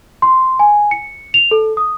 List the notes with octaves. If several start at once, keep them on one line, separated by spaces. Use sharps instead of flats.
C6
G#5
C#7
F7
A4
D#6